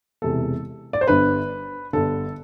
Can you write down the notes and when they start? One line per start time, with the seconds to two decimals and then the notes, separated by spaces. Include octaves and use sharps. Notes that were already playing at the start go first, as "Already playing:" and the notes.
0.22 E1 E2 C3 E3 A4
0.93 D5
1.01 C5
1.08 G1 G2 D3 B4
1.93 G1 G2 D3 A4